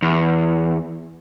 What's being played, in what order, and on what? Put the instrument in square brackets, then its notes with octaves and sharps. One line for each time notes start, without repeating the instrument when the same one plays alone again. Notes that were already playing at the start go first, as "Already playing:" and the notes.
[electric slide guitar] E2